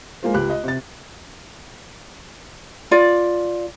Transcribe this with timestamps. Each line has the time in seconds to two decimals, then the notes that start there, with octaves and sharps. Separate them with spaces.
0.23 G#3 A#3 F4 C5
0.34 C#2 G4 F#6
0.50 D#5
0.64 C3 A6
2.91 F4 D5